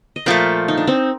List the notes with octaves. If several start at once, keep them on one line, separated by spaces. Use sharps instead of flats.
D#5
A#2 F3 A3 A#4 D5
D#4
D4
C4 D#4